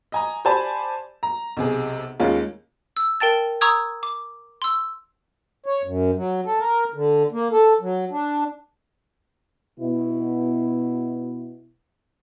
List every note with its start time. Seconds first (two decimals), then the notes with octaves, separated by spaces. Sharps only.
0.12 D#5 G#5 A#5
0.45 G4 C5 D5 G#5 A5 B5
1.23 A#5
1.57 B1 C3 G#4
2.20 D#2 G#3 C#4 F4
2.97 E6
3.20 A#4 G5 A5 A6
3.61 A#5 C#6 D#6 E6 G#6
4.03 D6
4.62 C6 E6
5.66 C#5
5.83 F#2
6.15 F#3
6.45 A4
6.60 A#4
6.94 D3
7.32 A#3
7.52 A4
7.81 F#3
8.11 D4
9.80 B2 E4